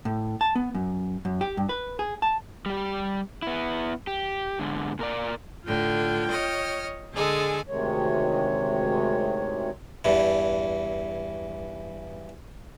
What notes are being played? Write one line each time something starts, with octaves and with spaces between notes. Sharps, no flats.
A2
A5
B3
F#2
F#2
G4
G2
B4
G#4
A5
G3 G4
B3 E4
G4
G#2 D3
A#2 A#4 D5
A2 D3 F4 G5
C#5 D#5 F6
D3 G#3 G#4 A4 G#5
D2 C3 D#3 G#3 C#5
E2 G2 E3